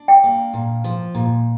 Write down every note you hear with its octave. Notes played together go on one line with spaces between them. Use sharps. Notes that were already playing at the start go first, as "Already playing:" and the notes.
Already playing: D4
G5
A#3
A#2
F3
A#2